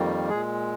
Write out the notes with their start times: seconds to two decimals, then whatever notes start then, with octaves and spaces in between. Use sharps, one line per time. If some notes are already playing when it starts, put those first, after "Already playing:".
Already playing: F2 D#3 G3 A#3
0.29 A#2 G#3 G#4